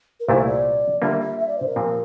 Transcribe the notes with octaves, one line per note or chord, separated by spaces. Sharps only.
A#4
C2 A#2 A3 E4 C5
D5
D3 G3 A#3 F4 E5
E5
E5
D5
C5
A#4
A#2 F3 C4 G4